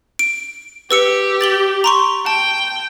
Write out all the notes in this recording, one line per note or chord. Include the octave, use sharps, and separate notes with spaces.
D7
G4 B4 E6 C#7
A6 F#7 G7
A#5 C6 C#6
G5 A5